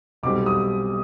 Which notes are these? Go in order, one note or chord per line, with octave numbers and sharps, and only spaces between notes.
B1 B2 G3 C4 D6
D#6